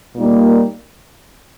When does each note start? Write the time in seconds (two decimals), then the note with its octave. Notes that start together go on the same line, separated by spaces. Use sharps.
0.16 A#2 G3 A#3 D#4